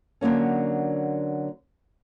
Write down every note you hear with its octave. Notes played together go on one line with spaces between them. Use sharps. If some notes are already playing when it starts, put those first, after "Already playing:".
D3 F#3 A#3 C#4